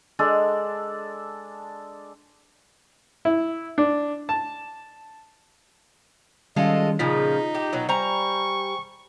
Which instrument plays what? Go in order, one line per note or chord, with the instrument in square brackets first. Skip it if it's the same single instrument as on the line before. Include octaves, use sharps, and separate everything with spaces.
[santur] G#3 D4 A4
[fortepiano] E4
D4
A5
[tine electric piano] D#3 G3 C#4 [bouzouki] G#3 F4 A4 [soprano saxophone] D#5
[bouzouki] A#2 C#3 F3 [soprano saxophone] D#4 [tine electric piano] F4 B6
[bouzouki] G4
B2 F#3
[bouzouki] G3 A#5 [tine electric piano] C5 G5 G#5 [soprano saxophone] C#6